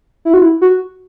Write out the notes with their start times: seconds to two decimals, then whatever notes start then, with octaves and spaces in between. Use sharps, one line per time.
0.25 E4
0.34 F#4
0.42 E4
0.61 F#4